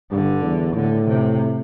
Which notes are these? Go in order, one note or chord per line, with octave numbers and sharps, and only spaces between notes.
G2 D3
E2
A2 D3
C3